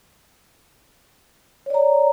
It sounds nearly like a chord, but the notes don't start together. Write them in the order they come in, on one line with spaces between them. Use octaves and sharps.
C#5 D5 A#5